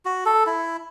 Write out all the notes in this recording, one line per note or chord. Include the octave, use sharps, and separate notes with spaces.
F#4
A4
E4